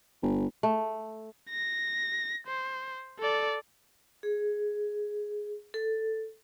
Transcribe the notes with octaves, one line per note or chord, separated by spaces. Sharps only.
G1
A3
A#6
C5
A4 D5
G#4
A4